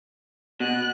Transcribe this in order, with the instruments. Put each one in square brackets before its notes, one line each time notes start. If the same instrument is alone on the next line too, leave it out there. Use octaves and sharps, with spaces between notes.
[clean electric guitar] B2 [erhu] F#6